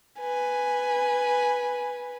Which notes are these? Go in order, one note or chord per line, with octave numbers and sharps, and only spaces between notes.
B4 G#5